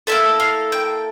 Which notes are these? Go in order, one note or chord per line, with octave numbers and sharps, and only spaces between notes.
A#3 E4 A4 E5
F5
G5